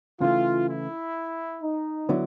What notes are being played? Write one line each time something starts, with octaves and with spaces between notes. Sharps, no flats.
C#3 E3 A3 F4
E4
D#4
D3 F#3 B3 E4